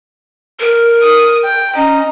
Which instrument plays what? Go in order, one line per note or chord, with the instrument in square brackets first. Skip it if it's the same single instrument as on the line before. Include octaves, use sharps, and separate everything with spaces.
[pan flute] A#4
[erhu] D#6
G5
[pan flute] C#4 [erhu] D#4